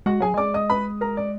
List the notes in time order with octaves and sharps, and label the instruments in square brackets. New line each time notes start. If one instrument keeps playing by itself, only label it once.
[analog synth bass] G#3 [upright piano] F#4 F#5
[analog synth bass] F#3 [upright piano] G#4 G#5
[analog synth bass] G#3 [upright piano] D5 D6
[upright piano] D#5 D#6
B4 B5
A#4 A#5
D5